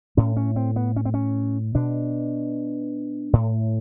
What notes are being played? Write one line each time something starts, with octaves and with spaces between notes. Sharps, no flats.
A2 C#4
C#4
C4
B3
C#4
C4
C#4
B2 D4
A2